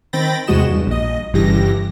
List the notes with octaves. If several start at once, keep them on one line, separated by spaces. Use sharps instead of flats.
D#3 C4 G5 B5 A6 A#6
E2 C3 G#3 F#4 D#5 E7
E2 G2
A#1 D#5
G1 G2 C#3 E3 G4 A#6